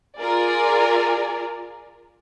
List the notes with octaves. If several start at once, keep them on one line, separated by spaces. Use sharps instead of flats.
F4 G#4 A#4 D5